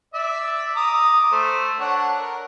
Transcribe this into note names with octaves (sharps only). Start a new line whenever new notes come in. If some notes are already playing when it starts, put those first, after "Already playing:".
D5 E5
A#5 D6 D#6
A3 C5
D4 C#5 F#5
A#4